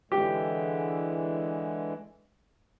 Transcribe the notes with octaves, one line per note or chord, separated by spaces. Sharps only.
D3 E3 G#3 G4